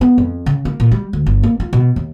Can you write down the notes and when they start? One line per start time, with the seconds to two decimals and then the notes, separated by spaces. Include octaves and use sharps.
0.01 B3
0.18 F2
0.46 C#3
0.65 A#3
0.80 A#2
0.91 G3
1.13 D2
1.26 G1
1.43 A#3
1.60 F4
1.73 B2
1.96 D#2